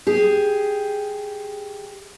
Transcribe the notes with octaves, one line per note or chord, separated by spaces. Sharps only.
G4 G#4